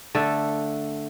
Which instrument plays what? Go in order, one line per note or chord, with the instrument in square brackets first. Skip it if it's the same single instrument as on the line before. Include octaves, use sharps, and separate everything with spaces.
[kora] D3 A3 A4